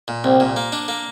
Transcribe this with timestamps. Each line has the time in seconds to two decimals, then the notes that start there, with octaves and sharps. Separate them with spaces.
0.08 A#2
0.24 C2 C4
0.40 A#2
0.56 A#3
0.72 D4
0.88 A#3